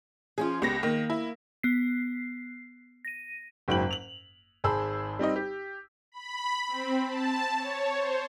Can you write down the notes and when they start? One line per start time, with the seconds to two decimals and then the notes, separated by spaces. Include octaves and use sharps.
0.38 F3 C#4 F4 G#4
0.62 C#2 B3 G4 A#6
0.83 D#3 A#3
1.10 E4
1.63 B3 C7
3.05 A#6 D#7
3.68 F#1 G#2 F#3 G5 B5 F#7
3.91 F7 F#7
4.64 G#1 G#4 C5 A5 B5 E6
5.19 G3 C4 D#4 D#5
5.36 G4
6.12 B5
6.68 C4
7.07 A5
7.57 C#5
7.96 C5